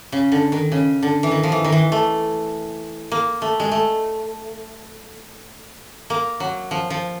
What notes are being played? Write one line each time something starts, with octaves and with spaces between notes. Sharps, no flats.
C#3
D3
D#3
C#3
D3
E3
D#3
F3
E3
D#3
E3
A3
A#3
A3
G#3
A3
A#3
F#3
F3
F3